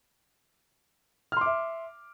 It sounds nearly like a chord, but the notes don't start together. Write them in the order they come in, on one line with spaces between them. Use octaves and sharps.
F6 C6 D6 E5